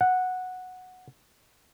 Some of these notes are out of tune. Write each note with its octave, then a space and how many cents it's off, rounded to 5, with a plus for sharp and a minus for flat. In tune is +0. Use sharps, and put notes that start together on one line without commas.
F#5 -5